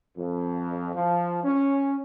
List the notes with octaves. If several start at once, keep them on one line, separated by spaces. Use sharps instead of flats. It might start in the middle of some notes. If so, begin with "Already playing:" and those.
F2
F3
C#4